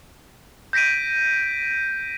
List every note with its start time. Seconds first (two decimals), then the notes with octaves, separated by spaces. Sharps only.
0.73 G6 A#6 B6 D7 D#7